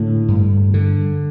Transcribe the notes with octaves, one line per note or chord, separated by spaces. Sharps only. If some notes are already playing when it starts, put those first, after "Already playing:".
Already playing: A2 D3 D4
G2
D3